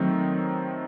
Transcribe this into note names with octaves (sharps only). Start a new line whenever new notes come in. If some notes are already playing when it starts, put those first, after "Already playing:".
Already playing: D#3 F#3 A3 C4 D#4